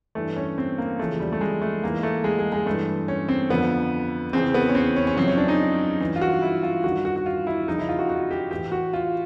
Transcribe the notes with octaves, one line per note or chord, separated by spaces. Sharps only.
G2 E3 A3
C#4
C4
A#3
E2 C#3 F3 A3
G3
A3
G#3
A3
G#2 E3 A#3
A3
G#3
G#3
G#3
G2 E3 A3
C#4
C4
F2 D3 F3 B3
E2 C#3 E3 C4
B3
C#4
C4
C#4
C#4
F#2 C#3 F3 C4
C#4
D4
D#4
G2 E3
F4
F#4
E4
F4
G2 D#3 F#4
F#4
F#4
F4
E4
F2 C#3 F3 D#4
E4
F4
F#4
F#4
G4
A2 E3 G4
F#4
F4